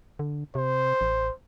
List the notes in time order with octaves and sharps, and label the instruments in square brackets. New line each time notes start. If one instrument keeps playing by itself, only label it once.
[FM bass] D3
[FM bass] C3 [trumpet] C5
[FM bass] A1